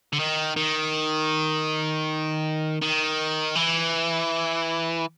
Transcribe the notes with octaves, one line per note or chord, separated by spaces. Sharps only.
D3
D#3
D#3
D#3
E3